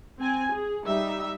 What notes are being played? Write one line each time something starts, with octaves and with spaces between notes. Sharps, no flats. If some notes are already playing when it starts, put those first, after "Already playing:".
C4 G#5
G#4
G3 D#4 E5